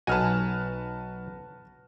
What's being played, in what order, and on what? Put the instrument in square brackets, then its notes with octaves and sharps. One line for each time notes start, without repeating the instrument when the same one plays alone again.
[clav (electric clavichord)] B1 D#4 G#5 [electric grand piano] F#4 B4 [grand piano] A5 F6 D#7